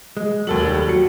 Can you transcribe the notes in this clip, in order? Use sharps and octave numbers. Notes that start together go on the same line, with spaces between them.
G#3
D#2 F#3 A4 F#7
G3 A3 G4
F#3 C#7